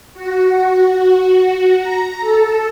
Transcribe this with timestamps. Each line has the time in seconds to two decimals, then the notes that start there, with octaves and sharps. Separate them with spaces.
0.14 F#4
1.77 A#5
2.20 A4